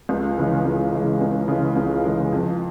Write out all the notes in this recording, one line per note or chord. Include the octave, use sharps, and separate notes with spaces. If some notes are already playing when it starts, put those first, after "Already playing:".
C#2
C#3 E3 G#3
C#2
C#3 E3 G#3
C#2
C#3 E3 G#3
C#2
C#3 E3 G#3
F2